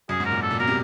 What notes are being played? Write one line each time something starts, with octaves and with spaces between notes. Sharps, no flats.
F#2 G#4
G#2
A#4
A#2
A4
A#2
B2 A#4
C3